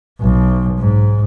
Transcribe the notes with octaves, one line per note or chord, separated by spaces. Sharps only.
B1
G#2